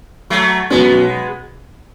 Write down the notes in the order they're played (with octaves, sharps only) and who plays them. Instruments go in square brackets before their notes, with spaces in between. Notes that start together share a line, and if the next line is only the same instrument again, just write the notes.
[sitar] F#3 A3
[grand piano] B1 B2 F#3 C#4 [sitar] G#3 B3